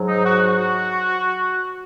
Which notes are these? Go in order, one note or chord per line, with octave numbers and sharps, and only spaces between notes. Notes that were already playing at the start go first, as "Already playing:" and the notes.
Already playing: G#2 F#3
D#4
F#4
F#4